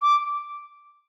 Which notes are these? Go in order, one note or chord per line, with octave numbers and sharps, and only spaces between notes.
D6